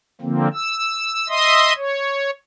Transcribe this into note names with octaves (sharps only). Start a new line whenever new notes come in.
D3 F3 A#3 C4
E6
D#5 E5 C6 D#6
C#5